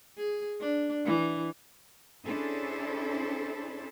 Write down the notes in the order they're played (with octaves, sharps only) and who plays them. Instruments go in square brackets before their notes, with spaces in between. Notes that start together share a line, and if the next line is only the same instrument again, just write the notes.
[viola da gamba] G#4
D4
E3
[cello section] C#4 D4 E4 G#4 A4 C5